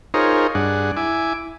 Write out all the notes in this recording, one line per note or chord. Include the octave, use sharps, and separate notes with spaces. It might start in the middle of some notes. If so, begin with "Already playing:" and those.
D#4 F4 G#4 A#4 C5 C#5
G2 D4 G#4 F#5
E4 G#5 D6